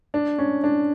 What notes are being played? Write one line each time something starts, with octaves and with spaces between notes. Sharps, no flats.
D4
C#4
D4